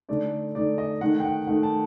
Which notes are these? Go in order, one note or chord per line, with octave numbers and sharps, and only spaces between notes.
D3 A3 D#4 D5
D3 A3 D#4 D5
D#5
D#3 A3 D#4 F#5
G5
F#5
D#3 A3 D#4 F#5
A5